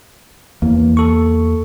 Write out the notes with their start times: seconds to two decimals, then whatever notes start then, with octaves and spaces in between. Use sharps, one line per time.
0.62 E2 E3 A#3
0.97 A4 C#6